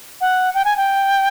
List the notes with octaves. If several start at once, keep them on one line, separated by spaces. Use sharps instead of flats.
F#5
G5
G#5
G5